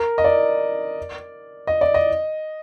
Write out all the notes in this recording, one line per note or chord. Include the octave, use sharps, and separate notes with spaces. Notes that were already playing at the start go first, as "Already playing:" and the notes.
Already playing: A#4
D#5
D5
D#5
D5
D#5